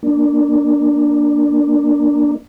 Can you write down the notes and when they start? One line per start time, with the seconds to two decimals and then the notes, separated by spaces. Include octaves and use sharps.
0.03 A#3 D4